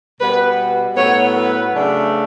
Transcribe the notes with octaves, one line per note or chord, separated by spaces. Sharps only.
B2 G3 B3 B4
A2 F#3 B3 C#5
B4
C#3 F#3 A3 D4